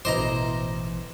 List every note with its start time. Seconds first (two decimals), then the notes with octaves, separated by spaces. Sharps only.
0.05 A1 B2 E3 E4 C5 D#5 A#5 D6